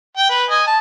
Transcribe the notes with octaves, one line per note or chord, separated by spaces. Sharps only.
G5
B4
D#5 G#5
A5